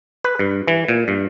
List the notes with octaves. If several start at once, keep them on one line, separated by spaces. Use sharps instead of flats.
B4
G2
E3
A#2
G2